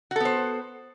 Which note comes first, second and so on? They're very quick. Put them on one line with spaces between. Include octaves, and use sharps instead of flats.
F#4 A4 B3 C5